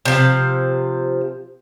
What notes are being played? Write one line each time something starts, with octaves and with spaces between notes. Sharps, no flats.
C3 F3